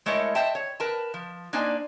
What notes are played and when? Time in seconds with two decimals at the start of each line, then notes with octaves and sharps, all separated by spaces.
0.06 G#3 A3 E4 A#4 C#5 D#5
0.35 C5 D#5 E5 G5 A5
0.55 C#5
0.80 A#4 B4 A5
1.14 F3
1.53 A#3 D4 D#4 C5 D5 G#5